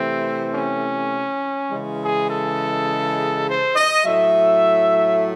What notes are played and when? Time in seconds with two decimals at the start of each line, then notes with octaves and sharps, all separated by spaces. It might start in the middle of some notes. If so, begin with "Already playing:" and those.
Already playing: C3 E3 A3 C4
0.53 C#4
1.71 C#3 E3 G#3
2.00 G#4
2.29 A4
3.47 C5
3.75 D#5
4.04 A2 F#3 A3 E5